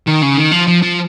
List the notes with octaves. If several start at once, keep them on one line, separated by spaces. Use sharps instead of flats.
D#3
C#3
D#3
F3
F3
F3